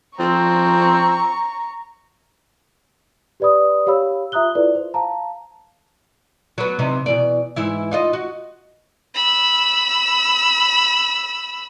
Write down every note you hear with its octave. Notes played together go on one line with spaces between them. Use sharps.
F3 C4 A#5 C#6
G4 B4 D5 B5 D#6
G4 C#5 F5 B5 E6
F4 E5 A#5 D#6 F#6 G7
E4 F4 A4 B4 D5
C5
F5 A5 A#5
F#3 B3
C3 E3 D#4
B2 E3 D5
G#2 E3 E4
D#4 F4 D#5
F#4
B5 E6